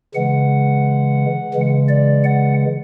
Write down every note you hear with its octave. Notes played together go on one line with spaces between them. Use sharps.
C#3 E3 G#3 F#5
C#3 E3 G#3
D5
F#5